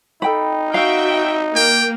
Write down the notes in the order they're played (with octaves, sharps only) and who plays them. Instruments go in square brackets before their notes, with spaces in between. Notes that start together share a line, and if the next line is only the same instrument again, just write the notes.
[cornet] D#4 [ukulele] A4 G5 B5
[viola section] F#4 E5 G5 [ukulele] F5
[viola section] A#3 [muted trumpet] G5